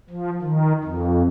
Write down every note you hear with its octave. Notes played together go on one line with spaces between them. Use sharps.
F3
D#3
F2